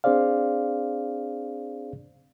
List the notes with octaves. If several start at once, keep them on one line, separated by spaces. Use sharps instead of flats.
C4 D4 G#4 C5 D5 F5